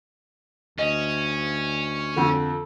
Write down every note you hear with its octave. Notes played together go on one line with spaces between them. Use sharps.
D2 C#4 D#5
F2 D3 A4